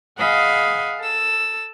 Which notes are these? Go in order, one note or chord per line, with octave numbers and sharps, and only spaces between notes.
G#4 D#5 F5 F#5 G#5 B5
A4 E6